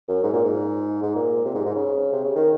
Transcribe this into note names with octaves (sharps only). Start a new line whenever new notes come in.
F#2
G#2
A#2
G#2
G#2
A#2
C3
G#2
G#2
C#3
C3
C#3
D#3